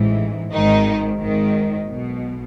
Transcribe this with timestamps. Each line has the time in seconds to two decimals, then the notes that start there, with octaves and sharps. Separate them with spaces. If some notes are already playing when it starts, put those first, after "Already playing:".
Already playing: A1 G#2 E3
0.52 G#1 G#2 D#3 D#4
1.20 G#1 G#2 D#3
1.88 B1 B2